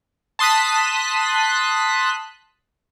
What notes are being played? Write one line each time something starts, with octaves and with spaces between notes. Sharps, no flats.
A5 C6 D#6 F#6 B6